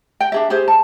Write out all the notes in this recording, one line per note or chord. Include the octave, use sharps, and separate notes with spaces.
G5
D4 G#4 E5
G4 G#4 C5
A5